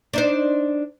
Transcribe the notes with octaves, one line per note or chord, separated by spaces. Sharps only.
D4 D#4 C5